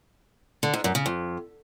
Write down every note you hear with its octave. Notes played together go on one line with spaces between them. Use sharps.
D3
G#2
F#2
C#3
F2